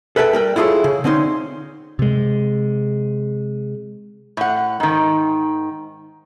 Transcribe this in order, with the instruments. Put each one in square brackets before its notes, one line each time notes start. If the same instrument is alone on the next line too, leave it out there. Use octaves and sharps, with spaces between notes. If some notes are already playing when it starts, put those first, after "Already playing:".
[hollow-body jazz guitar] A4 B4 E5 G5 A5
G3 A#4 G5
E4 F4 G#4 A4 C#5
C#3
D3 C4 C#4 D#4 C6
[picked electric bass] C3 G#3
[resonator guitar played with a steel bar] A2 F#5
G#2 D#3